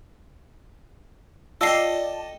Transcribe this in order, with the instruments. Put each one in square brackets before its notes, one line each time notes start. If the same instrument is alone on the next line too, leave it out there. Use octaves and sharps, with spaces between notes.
[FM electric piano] F4 D5 [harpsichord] A4 D#5 G5 [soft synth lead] A5 [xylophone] E6 C7